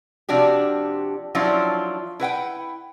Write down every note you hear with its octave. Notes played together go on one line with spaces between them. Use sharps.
C3 F3 D4 F#4 G4
F3 F#3 C#4 D4 E4 F4
E4 B4 F#5 G5